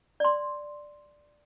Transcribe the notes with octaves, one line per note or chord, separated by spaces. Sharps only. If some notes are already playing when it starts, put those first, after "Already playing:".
D5 C6